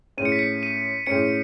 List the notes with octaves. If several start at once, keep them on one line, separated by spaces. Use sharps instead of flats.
A2 G#3 C#4 D#7
C#7
B6
C#7
D#7
A2 G#3 C#4 C#7